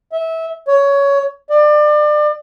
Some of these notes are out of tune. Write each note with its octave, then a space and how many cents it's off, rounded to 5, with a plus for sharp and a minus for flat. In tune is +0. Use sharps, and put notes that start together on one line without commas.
E5 -20
C#5 +15
D5 +30